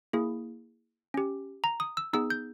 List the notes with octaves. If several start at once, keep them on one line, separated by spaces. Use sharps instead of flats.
A#3 E4 G#4
C#4 G4
A#5
D#6
E6
B3 D#4 G#4 E6
G6